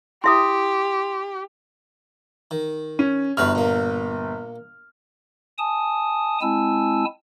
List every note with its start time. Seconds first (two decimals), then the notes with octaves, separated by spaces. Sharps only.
0.24 E4 G4 E5 C6 D#6
2.51 D#3
2.99 C#4
3.37 G1 E4 F#4 B4 F6
3.55 A#2 A#3
5.58 G#5 A5 D#6
6.41 G#3 C4 E4 G#5 A5 E6